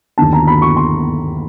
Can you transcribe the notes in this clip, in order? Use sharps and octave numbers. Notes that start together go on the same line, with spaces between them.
D#2 D3 A5
A#5
B5
C#6
C6